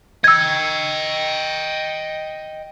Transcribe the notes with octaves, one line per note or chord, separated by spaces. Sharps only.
D#5 G5 E6 G#6